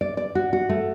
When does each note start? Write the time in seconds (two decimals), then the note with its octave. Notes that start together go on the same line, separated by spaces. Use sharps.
0.01 D5
0.17 D5
0.35 F#4
0.53 F#4
0.69 A3